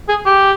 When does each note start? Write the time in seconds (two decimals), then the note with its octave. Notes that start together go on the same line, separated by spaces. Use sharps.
0.09 G#4
0.26 G4